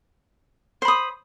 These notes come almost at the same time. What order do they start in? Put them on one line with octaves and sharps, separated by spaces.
C5 B5 D#6